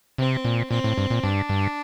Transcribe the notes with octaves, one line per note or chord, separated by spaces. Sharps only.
C3 C4
A#2
A#2 C4
A2
G2
A#2
G2 D4
G2